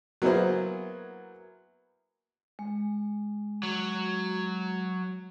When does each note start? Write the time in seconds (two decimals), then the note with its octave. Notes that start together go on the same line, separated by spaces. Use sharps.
0.22 F#3 A#3 B3 E4 G#4 C5
2.59 G#3
3.63 F#3